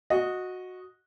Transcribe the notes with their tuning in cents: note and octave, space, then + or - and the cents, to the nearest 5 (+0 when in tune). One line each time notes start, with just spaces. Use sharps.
F#4 -10 D#5 +0